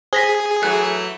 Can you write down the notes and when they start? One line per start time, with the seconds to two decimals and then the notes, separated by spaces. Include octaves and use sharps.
0.13 G#4 C5 A#6 B6
0.63 E3 F#3 A3 F#6